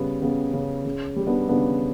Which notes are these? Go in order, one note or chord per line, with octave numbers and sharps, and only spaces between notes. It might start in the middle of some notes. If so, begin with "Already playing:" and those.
Already playing: C#3 G3 B3
C#3 B3
C#3
C#3
G3
B3 D4
C#3 B3 D4